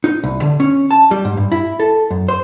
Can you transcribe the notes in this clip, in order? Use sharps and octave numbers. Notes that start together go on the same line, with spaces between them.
D#4
C2
D3
C#4
A5
G3
G#2
G2
E4
A4
F#2
C5